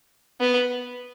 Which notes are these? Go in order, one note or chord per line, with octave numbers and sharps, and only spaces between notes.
B3